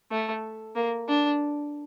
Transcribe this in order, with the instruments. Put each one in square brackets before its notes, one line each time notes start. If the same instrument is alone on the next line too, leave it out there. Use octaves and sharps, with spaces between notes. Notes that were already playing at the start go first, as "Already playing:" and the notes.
[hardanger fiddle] A3
A#3
D4